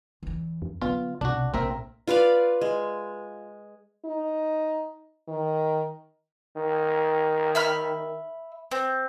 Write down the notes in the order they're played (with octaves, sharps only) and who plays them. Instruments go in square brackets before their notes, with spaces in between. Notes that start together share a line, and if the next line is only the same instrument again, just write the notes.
[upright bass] E2 E3
[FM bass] F2
[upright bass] D3 F#3 [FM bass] B3 [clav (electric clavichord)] F4
[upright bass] B1 [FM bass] C3 [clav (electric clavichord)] D4 F#4
[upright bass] A#1 A3 [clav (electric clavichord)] C4 A#4 E5
[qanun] F4 B4 D5 F5
G#3
[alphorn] D#4
D#3
[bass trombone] D#3
[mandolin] E5 B5 F6
C4